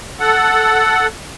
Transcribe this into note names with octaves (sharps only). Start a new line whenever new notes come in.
A4 F#5